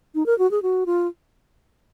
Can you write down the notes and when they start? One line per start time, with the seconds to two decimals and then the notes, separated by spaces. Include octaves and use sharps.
0.15 D#4
0.26 A#4
0.39 F#4
0.51 G#4
0.63 F#4
0.86 F4